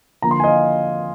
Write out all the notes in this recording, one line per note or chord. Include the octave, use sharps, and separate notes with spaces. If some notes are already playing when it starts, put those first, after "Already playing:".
D3 F3 A#3 A#5
C6
G#5
D#5
F5